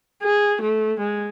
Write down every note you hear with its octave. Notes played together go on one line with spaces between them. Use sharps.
G#4
A3
G#3